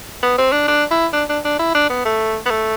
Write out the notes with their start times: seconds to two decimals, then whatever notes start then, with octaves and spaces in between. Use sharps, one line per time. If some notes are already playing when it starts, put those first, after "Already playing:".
0.23 B3
0.38 C4
0.52 D4
0.68 D4
0.91 E4
1.13 D4
1.29 D4
1.45 D4
1.59 E4
1.75 D4
1.90 B3
2.05 A3
2.46 B3
2.50 A3